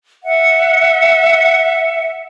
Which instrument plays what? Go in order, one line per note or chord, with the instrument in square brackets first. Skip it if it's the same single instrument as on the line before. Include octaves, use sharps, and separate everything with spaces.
[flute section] E5 F#5